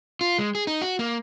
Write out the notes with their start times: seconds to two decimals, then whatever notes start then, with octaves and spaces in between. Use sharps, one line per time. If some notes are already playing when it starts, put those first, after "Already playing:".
0.21 F4
0.39 G#3
0.55 G#4
0.67 D#4
0.82 F#4
0.99 A#3